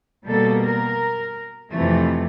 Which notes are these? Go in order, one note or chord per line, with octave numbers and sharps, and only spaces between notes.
B2 G3 A#3 A4
A#4
F2 C3 E3 A3